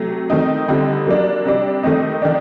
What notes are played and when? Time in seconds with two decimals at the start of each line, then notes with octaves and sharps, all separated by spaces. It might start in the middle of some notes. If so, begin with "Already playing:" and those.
Already playing: C3 F#3 A3
0.30 D#3 A3 C4 D#4
0.68 D3 G3 C4 D#4
1.07 F#3 A#3 D4
1.45 C3 G3 D4
1.83 D#3 A3 C4 D#4
2.22 D#3 A3 D4